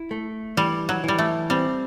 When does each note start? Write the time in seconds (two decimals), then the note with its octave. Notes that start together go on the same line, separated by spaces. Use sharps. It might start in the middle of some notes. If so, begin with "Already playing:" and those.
Already playing: E4
0.11 A3
0.57 E3 G3
0.89 F#3
1.04 E3 G3
1.18 A3
1.50 G3 C4